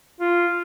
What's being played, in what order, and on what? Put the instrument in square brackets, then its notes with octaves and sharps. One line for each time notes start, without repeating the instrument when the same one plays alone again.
[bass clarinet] F4